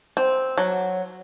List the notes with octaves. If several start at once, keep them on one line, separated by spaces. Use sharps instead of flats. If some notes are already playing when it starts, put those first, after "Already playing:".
C4
F#3